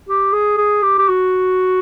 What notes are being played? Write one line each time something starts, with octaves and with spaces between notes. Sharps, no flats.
G4
G#4
G#4
G4
G4
F#4